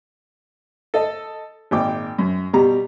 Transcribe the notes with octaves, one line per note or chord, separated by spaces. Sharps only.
A4 D#5
G#1 A#2 G5 D6
F#2
B2 G3 G4 A#5